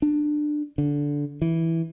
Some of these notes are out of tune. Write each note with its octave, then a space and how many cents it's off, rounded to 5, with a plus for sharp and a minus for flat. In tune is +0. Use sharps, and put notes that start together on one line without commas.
D4 +20
D3 -15
E3 -5